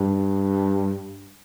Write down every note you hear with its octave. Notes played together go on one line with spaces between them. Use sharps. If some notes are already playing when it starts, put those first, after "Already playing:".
Already playing: G2